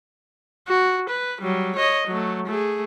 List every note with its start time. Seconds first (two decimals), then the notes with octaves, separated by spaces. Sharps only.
0.68 F#4
1.09 B4
1.41 F#3 G3
1.76 C#5 D#5
2.07 F#3 A3
2.46 A3 G#4